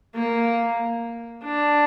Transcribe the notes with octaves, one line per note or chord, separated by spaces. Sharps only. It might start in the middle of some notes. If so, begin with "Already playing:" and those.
A#3
D4